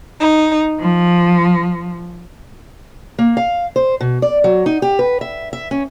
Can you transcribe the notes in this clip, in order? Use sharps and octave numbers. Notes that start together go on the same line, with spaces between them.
D#4
F3
A#3
F5
C5
B2
D5
F#3
D#4
G4
B4
E5
E5
C#4